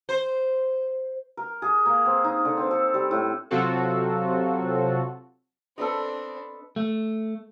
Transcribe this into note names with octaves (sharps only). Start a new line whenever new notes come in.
C5
A#4
G#4
A#3
C4
D#4
D3
C4
A4
G3
A2
C3 F#3 C4 F4 F#4 A4
C4 D4 A4 B4 D#5
A3